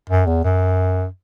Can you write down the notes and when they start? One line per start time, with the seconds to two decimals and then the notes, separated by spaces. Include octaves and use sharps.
0.10 F#2
0.27 E2
0.44 F#2